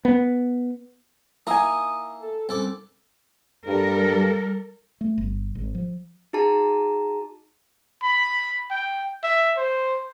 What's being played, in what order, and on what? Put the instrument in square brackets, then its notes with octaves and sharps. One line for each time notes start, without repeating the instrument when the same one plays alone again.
[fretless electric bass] B3
[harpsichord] A#3 D#4 E4 [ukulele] G#5 A#5 [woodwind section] D#6
[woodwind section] A4
[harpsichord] C2 A4 D6 [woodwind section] F#2
[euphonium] G2 [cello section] G3 A4 A#4
[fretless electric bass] A3
G1
G#1
F3
[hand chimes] D#4 F#4 G#4 A5 A#5
[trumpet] B5
G5
E5
C5